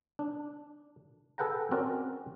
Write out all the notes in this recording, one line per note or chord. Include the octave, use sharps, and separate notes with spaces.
D4
G#4 A4 B4 F#5 G5 A#5
C4 C#4 F#4 A#4 D5